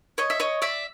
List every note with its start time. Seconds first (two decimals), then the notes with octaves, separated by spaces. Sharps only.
0.18 C#5 D#5
0.30 E5
0.40 C#5 D#5
0.62 D5 E5